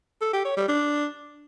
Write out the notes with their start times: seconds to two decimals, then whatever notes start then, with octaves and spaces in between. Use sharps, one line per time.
0.21 A4
0.33 G4
0.45 C#5
0.57 G3
0.68 D4